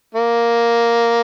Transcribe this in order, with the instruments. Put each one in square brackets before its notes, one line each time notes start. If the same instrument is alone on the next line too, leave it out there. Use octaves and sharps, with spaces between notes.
[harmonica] A#3